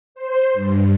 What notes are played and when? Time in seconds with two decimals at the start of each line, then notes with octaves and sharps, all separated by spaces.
0.15 C5
0.54 G2